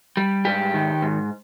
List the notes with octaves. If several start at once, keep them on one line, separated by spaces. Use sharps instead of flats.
G3
G#2 G4
D#3
G#2